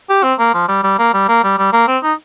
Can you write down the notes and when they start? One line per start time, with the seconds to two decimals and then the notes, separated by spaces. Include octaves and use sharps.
0.09 G4
0.23 C4
0.39 A#3
0.54 F3
0.68 G3
0.83 G3
0.99 A#3
1.13 G3
1.28 A#3
1.43 G3
1.58 G3
1.73 A#3
1.87 C4
2.03 D#4